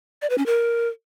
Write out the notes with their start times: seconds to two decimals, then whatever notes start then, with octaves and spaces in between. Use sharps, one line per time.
0.22 D5
0.30 B4
0.38 C#4
0.46 A#4